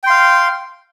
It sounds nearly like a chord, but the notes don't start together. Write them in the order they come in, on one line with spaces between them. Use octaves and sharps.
G5 C6 F5